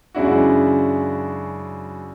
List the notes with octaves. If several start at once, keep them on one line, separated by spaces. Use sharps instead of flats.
F#2 C#3 G#3 D4 E4 F#4